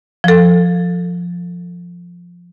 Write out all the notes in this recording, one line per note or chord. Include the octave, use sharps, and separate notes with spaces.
F3 A4